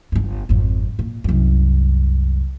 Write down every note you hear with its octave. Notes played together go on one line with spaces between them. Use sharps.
G1 G2
G#1 F2
A#2
C2 F#2